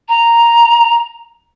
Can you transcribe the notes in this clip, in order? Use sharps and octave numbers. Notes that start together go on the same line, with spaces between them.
A#5